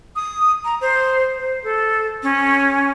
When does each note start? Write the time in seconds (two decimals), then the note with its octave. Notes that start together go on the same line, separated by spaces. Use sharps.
0.16 D#6
0.65 A#5
0.81 C5
1.38 C5
1.64 A4
2.23 C#4